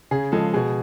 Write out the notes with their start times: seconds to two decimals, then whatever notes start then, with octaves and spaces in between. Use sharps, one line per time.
0.11 C#3 G#4
0.32 F3 G#3 A4
0.53 B2 G#4